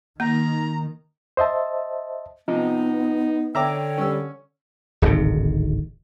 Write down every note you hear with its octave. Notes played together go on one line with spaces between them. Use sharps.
D#3 A#3 A#5
C5 D#5 E5 A5
C3 F3 B3 D#4
D3 C#5 E5 G5 A#5 D6
G3 C#4 E6
D1 G#1 G#2 C3